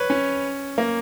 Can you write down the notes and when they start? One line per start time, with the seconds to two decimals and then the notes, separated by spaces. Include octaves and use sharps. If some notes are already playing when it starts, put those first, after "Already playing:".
Already playing: B4 C#5
0.10 C#4
0.78 A#3